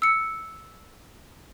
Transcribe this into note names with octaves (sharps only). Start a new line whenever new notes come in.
E6 C#7